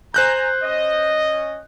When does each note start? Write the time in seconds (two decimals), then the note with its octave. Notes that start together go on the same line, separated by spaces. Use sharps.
0.14 C5 G#5 A#5 F#6 G6
0.63 C#4 D#5